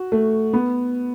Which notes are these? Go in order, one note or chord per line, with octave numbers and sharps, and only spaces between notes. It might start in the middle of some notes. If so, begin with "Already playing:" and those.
Already playing: F#4
A3
B3